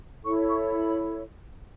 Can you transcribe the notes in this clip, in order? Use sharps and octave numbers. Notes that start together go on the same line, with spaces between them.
E4 A4 C#5 C#6
C#6
B5